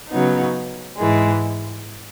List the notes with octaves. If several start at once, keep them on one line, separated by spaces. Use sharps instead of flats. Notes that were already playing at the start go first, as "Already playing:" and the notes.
C#3 F#3 B3 D#4
G#2 E3 G#3